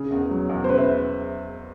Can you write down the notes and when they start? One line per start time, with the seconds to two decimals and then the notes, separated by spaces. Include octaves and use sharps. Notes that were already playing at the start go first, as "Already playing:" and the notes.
Already playing: C#3
0.11 E2
0.30 F#3
0.49 E2
0.64 C5
0.68 C#3 B4
0.78 E5